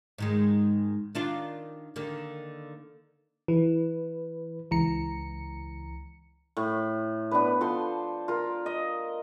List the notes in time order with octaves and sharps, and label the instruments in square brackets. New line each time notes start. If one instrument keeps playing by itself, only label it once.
[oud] G#2 D#3 G#3
D#3 D4 F4
D3 D#3 A#3
[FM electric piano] E3 [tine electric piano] B4
[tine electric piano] C#2 [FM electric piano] E3 A#5 C#7
[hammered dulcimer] A2
B3 D4 B4
F3 A4 C5 C6
F4 A#4
D#5